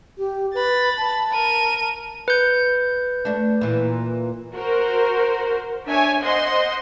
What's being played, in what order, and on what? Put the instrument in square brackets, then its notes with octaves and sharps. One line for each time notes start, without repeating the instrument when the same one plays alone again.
[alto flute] G4
[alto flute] B4 [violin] B5 A6
[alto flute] A5
[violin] A#4 D#7
[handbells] B4 G6
[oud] A3 D4
A#2 E3
[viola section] F#4 A#4 C5
D4 C#5 E5 G#5
C5 D#5 F#5 C6